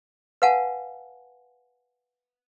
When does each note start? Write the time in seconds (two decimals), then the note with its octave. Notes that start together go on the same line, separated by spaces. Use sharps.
0.42 B4 F5 F#5 G#5 A5